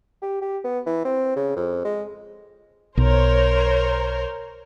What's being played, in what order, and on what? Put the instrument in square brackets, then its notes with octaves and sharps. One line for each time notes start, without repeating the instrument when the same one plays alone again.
[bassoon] G4
G4
B3
E3
C4
C#3
F2
G#3
[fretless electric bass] B1 [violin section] A#4 C5 C#5